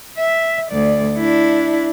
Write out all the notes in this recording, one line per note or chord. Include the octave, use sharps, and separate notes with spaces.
E5
D2 D5
D4 E4